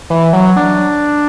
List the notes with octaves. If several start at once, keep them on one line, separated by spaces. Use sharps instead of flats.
E3
F#3
D4